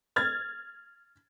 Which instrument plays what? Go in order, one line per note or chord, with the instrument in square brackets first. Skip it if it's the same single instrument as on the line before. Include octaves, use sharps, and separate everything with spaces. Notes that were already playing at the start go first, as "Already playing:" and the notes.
[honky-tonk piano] F6 G#6 A6